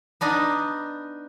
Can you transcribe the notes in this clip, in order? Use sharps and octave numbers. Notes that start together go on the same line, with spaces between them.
B3 D4 D#4